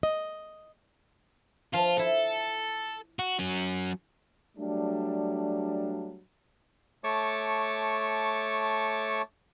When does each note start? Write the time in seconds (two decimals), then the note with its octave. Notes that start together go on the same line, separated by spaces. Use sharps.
0.03 D#5
1.74 F3 F4
1.99 E4 A4
3.19 F#4
3.39 F#3 C#4
4.57 F#3 G3 A3 D4
7.04 A3 C#5 A5 C#6 D6